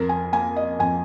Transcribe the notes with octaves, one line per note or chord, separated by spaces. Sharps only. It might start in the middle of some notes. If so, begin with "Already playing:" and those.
Already playing: F2 A#4
G#5
A#3 G#5
D#5
F2 G#5